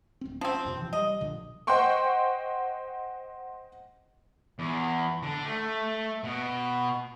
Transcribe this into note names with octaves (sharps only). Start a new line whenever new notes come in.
D1 C4
F3 C4 C#4
A1 F2 B2
C3 E3 F3
G3 D#5
A#1 A#2 D3
C5 D#5 F#5 G5 C6 C#6
E2
D3
A3
B2